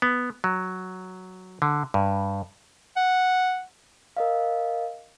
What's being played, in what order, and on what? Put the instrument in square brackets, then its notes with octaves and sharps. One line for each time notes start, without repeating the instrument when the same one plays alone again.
[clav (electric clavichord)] B3
F#3
D3
G2
[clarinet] F#5
[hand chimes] A#4 D#5 F5